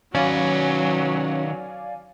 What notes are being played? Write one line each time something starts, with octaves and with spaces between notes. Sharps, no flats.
D#3 F#3 C#4 B4 D5 F5 G#5